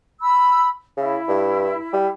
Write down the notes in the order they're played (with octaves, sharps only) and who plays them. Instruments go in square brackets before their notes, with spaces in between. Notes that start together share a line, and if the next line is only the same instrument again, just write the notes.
[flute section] B5 E6
[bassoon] C#3 [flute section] E4
[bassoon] G2
G3